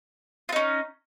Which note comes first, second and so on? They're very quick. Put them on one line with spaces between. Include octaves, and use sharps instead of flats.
F4 D#4 C#4